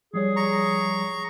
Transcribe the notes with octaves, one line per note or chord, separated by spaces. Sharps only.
F3 G3 G#4 C#5
A#5 C#6